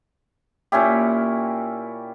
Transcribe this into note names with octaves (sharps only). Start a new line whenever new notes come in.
A#2 C#4 E4 G4